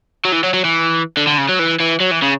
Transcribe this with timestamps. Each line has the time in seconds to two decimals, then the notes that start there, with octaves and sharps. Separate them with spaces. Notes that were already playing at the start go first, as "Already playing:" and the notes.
0.25 F#3
0.32 E3
0.43 F#3
0.54 F#3
0.65 E3
1.17 D3
1.27 D3
1.38 C#3
1.49 F#3
1.59 E3
1.80 E3
2.01 F#3
2.11 E3
2.23 C#3